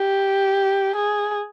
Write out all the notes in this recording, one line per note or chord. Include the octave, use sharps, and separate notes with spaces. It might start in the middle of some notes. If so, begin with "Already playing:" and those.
Already playing: G4
G#4